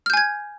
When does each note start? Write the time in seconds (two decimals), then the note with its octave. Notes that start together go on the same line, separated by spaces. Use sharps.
0.06 F6
0.10 G6
0.13 G#5
0.17 G#6